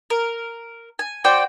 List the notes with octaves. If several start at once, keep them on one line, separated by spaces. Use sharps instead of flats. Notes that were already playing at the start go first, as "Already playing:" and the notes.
A#4
G#5
F#4 C5 D5 G5